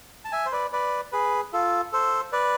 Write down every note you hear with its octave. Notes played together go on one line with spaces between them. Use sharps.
A5
E5 G#5
C5
B4 D5
B4 D5
G#4 B4
F4 A4
A4 C5
B4 D5